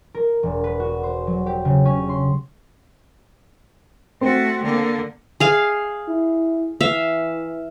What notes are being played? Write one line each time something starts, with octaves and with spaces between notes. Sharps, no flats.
A#4
E1
B4
F#4
C5
F#3
G4
C#3
C#4
C6
A3 C4 F#4
D3 A#3
G#4 F5 G#5
E4
E3 E5 F5